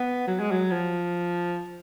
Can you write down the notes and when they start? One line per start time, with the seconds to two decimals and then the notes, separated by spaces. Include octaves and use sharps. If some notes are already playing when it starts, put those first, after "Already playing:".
Already playing: B3
0.27 F#3
0.40 G#3
0.51 F#3
0.71 F3